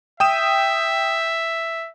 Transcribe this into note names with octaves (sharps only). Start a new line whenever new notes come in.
E5 G5 D#6 E7